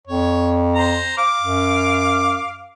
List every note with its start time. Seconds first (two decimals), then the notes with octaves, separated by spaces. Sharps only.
0.07 F2 C#5
0.75 C5 A#5
1.18 F5 D6
1.40 F#2